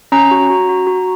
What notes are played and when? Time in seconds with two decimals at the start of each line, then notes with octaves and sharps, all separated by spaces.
0.12 C#4 A#5
0.31 F#4
0.50 F#4
0.69 F#4
0.87 F#4